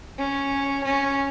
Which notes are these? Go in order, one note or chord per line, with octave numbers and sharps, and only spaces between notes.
C#4
C#4